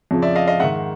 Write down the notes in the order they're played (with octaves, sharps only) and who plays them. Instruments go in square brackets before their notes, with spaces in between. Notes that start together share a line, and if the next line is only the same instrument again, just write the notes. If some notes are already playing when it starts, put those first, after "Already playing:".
[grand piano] F2 C#3 F3
D5 E5
D#5 F5
D#5 F5
G#2 E5 F#5
D#3